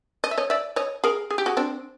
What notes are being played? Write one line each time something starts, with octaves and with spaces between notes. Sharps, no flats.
D#5
E5
C#5 D#5
D5 E5
C#5 D#5
G#4 A#4
G#4
G4
F#4 G#4
C4 D4